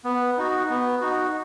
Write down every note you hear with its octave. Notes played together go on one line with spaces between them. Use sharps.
B3
D#4 F#4
B3
D#4 F#4